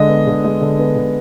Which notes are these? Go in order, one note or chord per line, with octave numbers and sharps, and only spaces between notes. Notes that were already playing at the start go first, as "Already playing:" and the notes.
Already playing: D3 G#3 D#5
B3
D3
G#3
D3
B3
D3